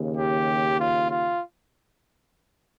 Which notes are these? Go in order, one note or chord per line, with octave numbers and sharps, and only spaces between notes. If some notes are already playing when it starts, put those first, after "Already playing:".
Already playing: D#2 C#3
G4
F4
F4